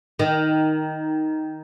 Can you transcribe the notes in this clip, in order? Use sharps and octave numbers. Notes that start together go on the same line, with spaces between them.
D#3